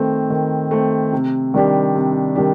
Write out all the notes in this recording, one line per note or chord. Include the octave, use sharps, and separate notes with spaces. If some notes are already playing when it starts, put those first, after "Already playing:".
Already playing: D#3 A3 C4
D#3
A3 C4
C3
D#3 G3 D4 G4
C3
D#3 G3 D4 G4